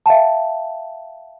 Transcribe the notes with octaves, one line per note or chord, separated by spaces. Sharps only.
E5 F5 G5 A5